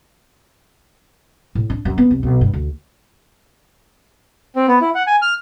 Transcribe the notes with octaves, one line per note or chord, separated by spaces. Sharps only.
A2
D4
F#2
B3
C2
B1
G2
D2
C4
B3
E4
F#5
G#5
F6